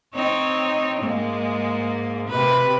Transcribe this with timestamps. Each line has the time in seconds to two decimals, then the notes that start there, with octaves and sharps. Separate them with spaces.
0.15 C4 D#4 C#5
1.01 G#2 G#3 A#3
2.28 C3 B4